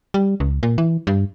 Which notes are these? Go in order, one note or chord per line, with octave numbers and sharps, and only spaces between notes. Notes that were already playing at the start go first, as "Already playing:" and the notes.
G3
C#2
A#2
E3
G2